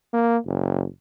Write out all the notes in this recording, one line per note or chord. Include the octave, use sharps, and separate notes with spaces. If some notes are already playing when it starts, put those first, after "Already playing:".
A#3
F#1